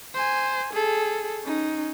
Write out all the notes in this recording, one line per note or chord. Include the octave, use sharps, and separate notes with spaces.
C5 G#5
G#4 A4
C#4 D#4